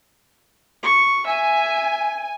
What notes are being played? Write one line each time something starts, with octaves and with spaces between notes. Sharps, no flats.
C#6
E5 G#5